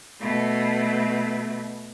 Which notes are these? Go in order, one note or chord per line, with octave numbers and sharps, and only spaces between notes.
B2 A3